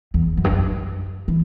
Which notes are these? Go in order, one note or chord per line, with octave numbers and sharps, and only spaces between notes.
E2
F#2
G2
F#2
E3